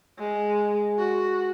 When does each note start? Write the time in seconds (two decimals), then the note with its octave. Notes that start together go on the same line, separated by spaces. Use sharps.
0.19 G#3
0.99 F#4